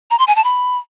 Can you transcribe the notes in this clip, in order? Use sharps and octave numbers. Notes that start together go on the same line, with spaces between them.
A#5
C6
G#5
A5
B5